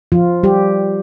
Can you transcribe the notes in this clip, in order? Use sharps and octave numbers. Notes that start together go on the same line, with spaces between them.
F3 F4
G3 G4